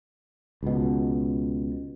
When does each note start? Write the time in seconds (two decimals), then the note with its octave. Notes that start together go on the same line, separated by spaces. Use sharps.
0.63 C#2 B2